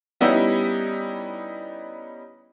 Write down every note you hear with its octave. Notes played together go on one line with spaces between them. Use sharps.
G3 B3 C#4 D#4 E4 G4